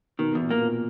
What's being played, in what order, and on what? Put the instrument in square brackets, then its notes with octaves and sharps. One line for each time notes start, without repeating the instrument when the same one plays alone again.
[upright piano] B2 [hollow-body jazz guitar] D#3
[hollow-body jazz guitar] E2 [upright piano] B2
[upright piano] A#2
[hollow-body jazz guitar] A#3
[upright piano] B2
A#2